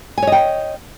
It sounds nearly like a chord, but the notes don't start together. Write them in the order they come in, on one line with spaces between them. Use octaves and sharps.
G#5 C#5 D#5 G5